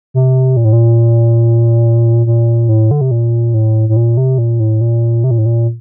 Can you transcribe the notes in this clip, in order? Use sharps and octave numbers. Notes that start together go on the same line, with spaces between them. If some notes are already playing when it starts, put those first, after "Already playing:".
C3
A#2
A2
A#2
A#2
A2
D3
C3
A#2
A2
A2
A#2
C3
A#2
A2
A#2
C3
A#2
A2
A#2